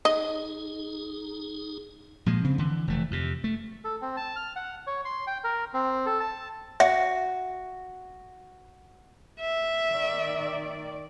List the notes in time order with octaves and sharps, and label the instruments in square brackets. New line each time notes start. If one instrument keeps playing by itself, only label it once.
[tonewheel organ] D#4 G#4 [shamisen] D#5
[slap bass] A#2 F3 G#3
C#3 C4
D3 E3
F1 E3 A3
F2 C3
A3
[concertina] A4
C4
A5
F6
F#5
C#5
C6
G5
A#4
C4
A4
A5
[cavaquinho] F#4 [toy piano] E5
[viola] E5
[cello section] D#3 D5